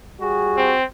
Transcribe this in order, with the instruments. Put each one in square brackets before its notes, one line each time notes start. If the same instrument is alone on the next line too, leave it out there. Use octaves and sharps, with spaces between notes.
[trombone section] G3 F#4 G#4
[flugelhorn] C4